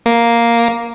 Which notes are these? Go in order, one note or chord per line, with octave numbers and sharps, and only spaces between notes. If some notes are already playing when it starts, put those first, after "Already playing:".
A#3